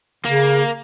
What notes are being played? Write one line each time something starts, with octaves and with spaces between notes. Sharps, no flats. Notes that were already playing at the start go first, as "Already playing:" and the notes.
C#3 A#3